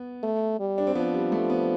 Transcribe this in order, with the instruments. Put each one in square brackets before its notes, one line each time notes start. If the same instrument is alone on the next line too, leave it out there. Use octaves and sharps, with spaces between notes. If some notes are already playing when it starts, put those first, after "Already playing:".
Already playing: [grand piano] B3
[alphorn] A3
G3
[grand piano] D4
C4
[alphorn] F3 [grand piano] B3
[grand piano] G3
A3
B3